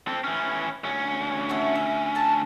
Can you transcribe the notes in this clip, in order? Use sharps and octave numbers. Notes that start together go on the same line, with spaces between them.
C4 A4
E3 C#4
D2 C#4
E4 F#4 A4
E5
A4 A5